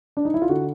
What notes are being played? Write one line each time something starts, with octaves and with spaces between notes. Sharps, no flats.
D4
D#4
E4
F4
D3 F#4